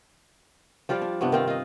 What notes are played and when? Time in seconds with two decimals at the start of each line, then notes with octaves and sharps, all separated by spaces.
0.89 F3 G3 F4 D5
1.02 D4
1.21 G2 C3 B3 D4
1.32 D#3 C4 F4
1.47 F4 D#5